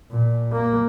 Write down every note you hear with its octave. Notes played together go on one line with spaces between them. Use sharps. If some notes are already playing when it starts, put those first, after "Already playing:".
A#2
A#3